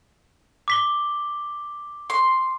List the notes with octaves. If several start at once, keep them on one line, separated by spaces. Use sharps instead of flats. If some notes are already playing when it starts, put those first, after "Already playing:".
D6 B6 G7
C6